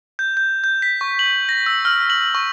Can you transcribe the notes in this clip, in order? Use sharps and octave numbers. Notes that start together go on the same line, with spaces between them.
G6
G6
G6
B6
C#6
F#7
A#6
E6
F6
F#7
C#6